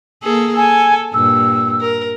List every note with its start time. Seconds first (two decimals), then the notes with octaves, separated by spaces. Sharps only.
0.23 A#3 G#4 A4
0.57 A4 G#5
1.14 G2 A#2 E6
1.81 A#4